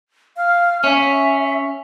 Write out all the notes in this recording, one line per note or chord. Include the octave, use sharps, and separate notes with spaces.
F5
C#4 E5